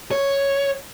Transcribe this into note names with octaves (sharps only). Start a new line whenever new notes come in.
C#5